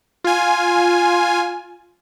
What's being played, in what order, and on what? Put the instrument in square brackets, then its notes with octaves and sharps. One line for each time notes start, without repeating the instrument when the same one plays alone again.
[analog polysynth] F4 G#5